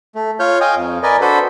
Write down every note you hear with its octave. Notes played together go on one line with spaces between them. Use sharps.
A3
F4 C#5 F6 G6
D#5 F5 G5 G#5 D#6
F2
A#4 B4 D5 D#5 G#5
D4 F#4 A4 B4 C5 B5